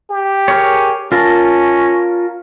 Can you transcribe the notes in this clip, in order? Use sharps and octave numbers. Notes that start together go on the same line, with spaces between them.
G4
G#4 A#4 C#5
C#4 F4 A#4 A5